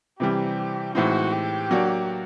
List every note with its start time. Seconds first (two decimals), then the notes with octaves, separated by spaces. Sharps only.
0.20 C3 E3 G3 G4
0.95 A2 E3 G#3 C4 D#4 F#4
1.33 G4
1.71 F#3 A#3 D4 F#4